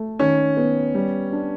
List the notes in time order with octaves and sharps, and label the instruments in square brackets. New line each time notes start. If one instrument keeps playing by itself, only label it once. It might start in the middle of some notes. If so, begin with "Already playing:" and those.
Already playing: [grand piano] A3
[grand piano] D#3 [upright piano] C#4
[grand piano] B3
G3
D4